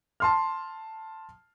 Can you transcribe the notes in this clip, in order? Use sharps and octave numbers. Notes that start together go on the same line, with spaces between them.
A5 C6 F6